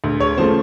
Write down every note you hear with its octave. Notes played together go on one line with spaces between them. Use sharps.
D2
C#5
C#3 F3 A3 C5